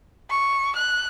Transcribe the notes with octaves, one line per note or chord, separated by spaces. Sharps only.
C#6
F#6